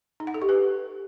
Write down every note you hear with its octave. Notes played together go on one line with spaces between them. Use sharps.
D#4
F#5
A4
G4
B4